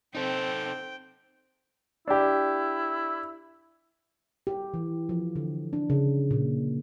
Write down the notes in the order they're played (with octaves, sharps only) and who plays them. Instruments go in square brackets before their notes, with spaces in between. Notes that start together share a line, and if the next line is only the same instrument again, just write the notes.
[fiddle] C4 [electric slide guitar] D#4 A4 [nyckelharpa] G5
[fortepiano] D4 G4 [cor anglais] E4
[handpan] G4
E3
F3
D3
D4
C#3
A#2